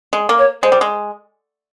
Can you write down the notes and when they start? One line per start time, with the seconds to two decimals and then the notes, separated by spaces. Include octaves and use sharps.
0.13 G#3
0.29 A#3
0.38 C#5
0.62 G#3 C5
0.72 G3
0.81 G#3